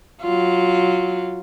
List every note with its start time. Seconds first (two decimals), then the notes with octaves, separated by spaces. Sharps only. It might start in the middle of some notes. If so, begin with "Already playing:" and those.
0.22 F#3 F4